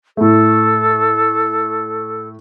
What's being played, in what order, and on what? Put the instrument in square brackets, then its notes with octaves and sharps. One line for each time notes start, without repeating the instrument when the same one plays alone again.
[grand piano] A2 A3 [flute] A4